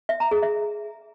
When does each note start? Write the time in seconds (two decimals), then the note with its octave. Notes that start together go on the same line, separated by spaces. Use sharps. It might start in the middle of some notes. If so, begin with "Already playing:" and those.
0.09 E5
0.20 A#5
0.31 G#4
0.43 E5